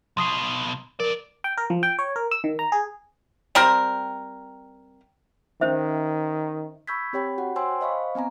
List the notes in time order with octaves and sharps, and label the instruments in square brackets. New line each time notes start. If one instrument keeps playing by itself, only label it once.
[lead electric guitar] B1 B2 [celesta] C6 D#6 C7
[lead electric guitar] F2 D5 [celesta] A#4
[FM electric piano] G5
A#4
F3
G5
C#5
A#4
E6
D#3
A#5
G#4
[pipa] G3 C4 A#4
[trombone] D#3 [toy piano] C#4 C5 E5
[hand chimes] B5 C#6 E6 G6 G#6 B6
C4 G4 C#5 G5 B5
F#4 F#5
C5 C#5 G5 G#5 C6 E6
C5 D#5 F5 B5 C#6
B3 C4 G#5 A#5